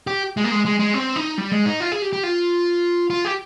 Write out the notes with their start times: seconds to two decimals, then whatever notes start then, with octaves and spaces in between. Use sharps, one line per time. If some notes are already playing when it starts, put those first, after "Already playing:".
0.07 G4
0.37 G#3
0.44 A#3
0.51 G#3
0.66 G#3
0.79 G#3
0.94 C4
1.16 D#4
1.38 G3
1.52 G#3
1.66 D#4
1.80 F4
1.92 G#4
2.02 G4
2.13 G4
2.23 F4
3.10 F4
3.25 G4